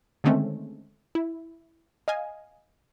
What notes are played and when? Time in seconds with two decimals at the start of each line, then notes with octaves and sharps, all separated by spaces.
0.24 D3 D#3 G#3 A3 C4 C#4
1.15 E4
2.08 D#5 F5 G#5